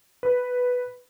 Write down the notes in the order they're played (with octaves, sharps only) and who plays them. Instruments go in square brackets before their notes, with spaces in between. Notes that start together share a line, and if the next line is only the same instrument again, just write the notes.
[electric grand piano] B4